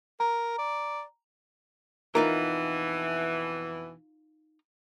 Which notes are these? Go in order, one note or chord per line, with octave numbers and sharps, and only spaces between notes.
A#4 A#5
D5
F2 B2 E3 D#4 F4 A#4